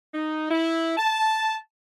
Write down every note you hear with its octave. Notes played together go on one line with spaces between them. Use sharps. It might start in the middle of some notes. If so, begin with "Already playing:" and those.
D#4
E4
A5